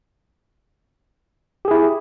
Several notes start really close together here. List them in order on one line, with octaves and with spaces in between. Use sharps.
G4 G#4 E4